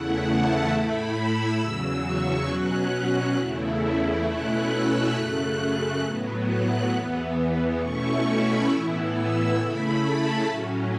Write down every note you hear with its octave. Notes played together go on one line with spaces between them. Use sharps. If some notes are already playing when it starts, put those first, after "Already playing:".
Already playing: E2 C#3 A3 E4 F#5
A5
A2 A3 E4 B5
E6
E2 C#3 F#3 E6
C#6
B2 F#3 C#4 F#6
F#6
E2 C#3 A3 E4
B2 A3 C#4 E4 F#6
E6
F#2 C#3 A3 F#6
A2 F#3 B3
F#6
E2 E3 B3
B2 A3 C#4 E4 C#6
B5
A2 E3 B3 E4
E6
C#3 A3 E4 B5
A5
A2 F#3 C#4